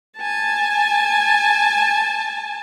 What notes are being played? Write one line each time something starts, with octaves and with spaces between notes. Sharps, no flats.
G#5 A5